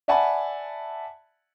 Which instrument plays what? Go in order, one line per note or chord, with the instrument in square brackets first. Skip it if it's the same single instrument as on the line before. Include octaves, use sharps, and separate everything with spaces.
[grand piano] D5 E5 F#5 G#5 A5 B5